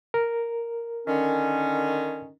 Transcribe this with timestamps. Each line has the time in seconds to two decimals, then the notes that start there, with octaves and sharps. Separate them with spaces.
0.14 A#4
1.08 D3 D#3 C#4